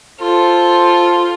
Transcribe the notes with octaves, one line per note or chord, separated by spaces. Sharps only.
F4 A4 C5